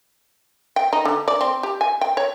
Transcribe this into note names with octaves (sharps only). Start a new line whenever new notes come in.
G5
D#4
D3
D5
C4
G4
G#5
G5
C#5